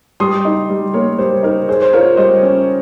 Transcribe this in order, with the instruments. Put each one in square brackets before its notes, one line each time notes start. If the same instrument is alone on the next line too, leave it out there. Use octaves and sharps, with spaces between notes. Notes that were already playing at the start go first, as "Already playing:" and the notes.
[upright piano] G3 [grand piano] C6 D#6
[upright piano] D#4
G3
[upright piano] A#3 [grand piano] A#4 C#5
[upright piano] G3 [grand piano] C5
[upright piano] D#4 [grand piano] A#4
[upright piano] G#4 [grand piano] C5
[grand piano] C5
[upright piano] F4 [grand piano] A#4 C#5
[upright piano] G3 [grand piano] C5 D#5
[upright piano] C#4